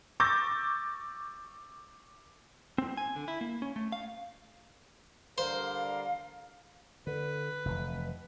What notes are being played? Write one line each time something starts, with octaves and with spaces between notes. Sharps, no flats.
C#6 D6 E6 G6 A6 A#6
C4
G#5
D3
E4
A#3
C#4
A3
F5
D3 G3 A#4 C5 F5
F5
D3 B4
F1 E3